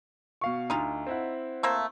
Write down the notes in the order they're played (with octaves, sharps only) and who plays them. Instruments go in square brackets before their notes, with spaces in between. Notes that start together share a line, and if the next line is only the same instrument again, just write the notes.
[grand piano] B2 F5 C#6
[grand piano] D2 [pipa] D#4 F4
[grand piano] C4 E4 F#5
[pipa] A3 A#3 C5